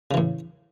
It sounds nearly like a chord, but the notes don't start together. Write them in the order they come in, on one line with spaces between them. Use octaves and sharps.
C#3 E3 A2